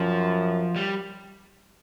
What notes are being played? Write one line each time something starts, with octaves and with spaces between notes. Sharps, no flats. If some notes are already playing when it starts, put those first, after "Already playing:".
Already playing: F#2 F3
G3